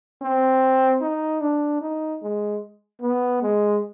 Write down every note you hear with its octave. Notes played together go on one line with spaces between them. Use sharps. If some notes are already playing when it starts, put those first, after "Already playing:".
C4
D#4
D4
D#4
G#3
B3
G#3